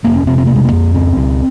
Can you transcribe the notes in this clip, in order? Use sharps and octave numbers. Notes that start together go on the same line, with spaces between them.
F1 A#3
C#4
C3 C4
C4
F1 A#3
G#3
A#3
F2
C#2 C4
C#2